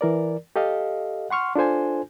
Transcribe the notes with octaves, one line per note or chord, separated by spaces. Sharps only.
E3 A#4 D5
G4 A4 D#5 F5
F#5 C6 C#6 F6
D4 F4 A4 C5 G#5